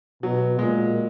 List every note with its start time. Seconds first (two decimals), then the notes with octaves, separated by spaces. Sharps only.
0.23 B2 F#3
0.59 A#2 G#3